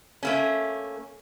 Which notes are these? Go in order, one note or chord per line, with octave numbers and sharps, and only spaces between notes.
A3 A#3 C#4